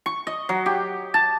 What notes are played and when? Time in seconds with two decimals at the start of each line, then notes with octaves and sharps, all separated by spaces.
0.06 C#6
0.27 D#5
0.49 F#3
0.66 G4
1.14 A5